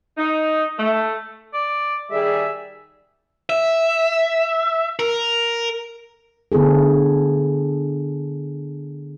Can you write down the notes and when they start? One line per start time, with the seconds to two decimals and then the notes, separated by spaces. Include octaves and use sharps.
0.18 D#4
0.79 A3
1.53 D5
2.11 D#3 G3 G#4 E5
3.50 E5
4.99 A#4
6.52 D3 B3 E4 G#4 A4